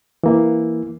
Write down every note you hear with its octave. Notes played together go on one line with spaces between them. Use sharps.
E3 A#3